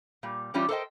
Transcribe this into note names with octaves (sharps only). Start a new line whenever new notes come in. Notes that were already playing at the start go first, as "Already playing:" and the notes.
A#2 G3
E3 G3 C#4 D4 F4
A4 A#4 C5 C#5 D#5 G5